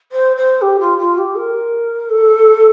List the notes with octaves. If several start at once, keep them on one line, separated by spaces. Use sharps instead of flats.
C5
C5
G4
F4
F4
G4
A#4
A4